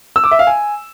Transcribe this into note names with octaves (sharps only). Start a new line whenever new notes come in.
E6
D6
E5
F5
G#5